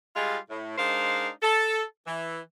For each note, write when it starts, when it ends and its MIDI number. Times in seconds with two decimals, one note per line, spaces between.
0.15 0.37 55
0.15 0.37 56
0.15 0.37 65
0.50 0.75 45
0.78 1.29 56
0.78 1.29 62
0.78 1.29 63
0.78 1.29 70
0.78 1.29 72
0.78 1.29 77
1.43 1.82 69
2.06 2.39 52